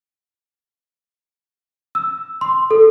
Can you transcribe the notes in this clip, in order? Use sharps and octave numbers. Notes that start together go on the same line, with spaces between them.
E6
C6
A4